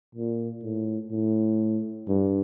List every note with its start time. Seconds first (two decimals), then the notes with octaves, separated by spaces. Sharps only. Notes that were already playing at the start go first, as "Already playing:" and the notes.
0.15 A#2
0.64 A2
1.12 A2
2.08 G2